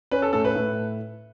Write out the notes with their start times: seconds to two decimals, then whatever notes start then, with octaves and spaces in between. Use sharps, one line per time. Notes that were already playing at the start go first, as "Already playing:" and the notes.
0.11 C#4 B4
0.22 A4
0.33 A2 A4
0.45 B4
0.55 A2